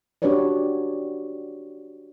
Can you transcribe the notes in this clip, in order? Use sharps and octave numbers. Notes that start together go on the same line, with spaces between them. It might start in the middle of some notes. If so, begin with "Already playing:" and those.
D4 F#4 G4 B4 C#5 D5